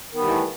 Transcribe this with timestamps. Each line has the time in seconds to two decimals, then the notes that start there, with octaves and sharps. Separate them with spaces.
0.11 D#3
0.15 B3
0.19 G3
0.23 E3
0.27 A3